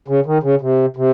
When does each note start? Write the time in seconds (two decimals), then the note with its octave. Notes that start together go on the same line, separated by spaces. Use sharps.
0.08 C#3
0.26 D#3
0.43 C#3
0.61 C3
0.96 C3